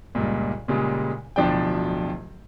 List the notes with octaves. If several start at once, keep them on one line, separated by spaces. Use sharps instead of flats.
C#2 G2 A#2
A#2 C#3 G3 G#3
D1 B2 F3 D4 D5 G5